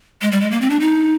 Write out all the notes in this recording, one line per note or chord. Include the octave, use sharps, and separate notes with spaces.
G#3
G3
G#3
A#3
C4
D4
D#4